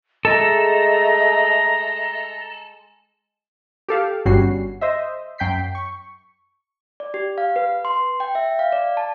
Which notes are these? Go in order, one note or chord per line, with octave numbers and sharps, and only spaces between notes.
G#3 A3 A4 D#5 A#5
G4 A4 F5
G1 G2 G3 C#4 F#4 C7
C5 D#5 E5
F#2 G5 G6 B6 C7
C#6
D5
G4
F5
B4
C6
G5
E5
F5
D5
A5